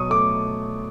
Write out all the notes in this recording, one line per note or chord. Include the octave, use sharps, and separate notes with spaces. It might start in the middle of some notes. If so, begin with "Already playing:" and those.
Already playing: B2 F#3 C#6 D#6
A3 D6